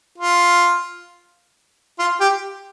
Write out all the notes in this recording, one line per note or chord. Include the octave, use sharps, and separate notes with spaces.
F4
F4
G4